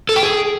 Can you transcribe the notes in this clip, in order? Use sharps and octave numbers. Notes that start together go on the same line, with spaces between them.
A4
G5
G#4